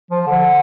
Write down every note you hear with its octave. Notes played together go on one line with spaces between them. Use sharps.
F3
D3